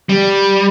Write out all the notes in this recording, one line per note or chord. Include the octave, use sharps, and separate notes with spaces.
G3